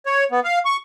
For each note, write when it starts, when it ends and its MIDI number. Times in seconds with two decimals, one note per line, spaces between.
0.06 0.24 73
0.32 0.40 59
0.44 0.59 77
0.65 0.77 85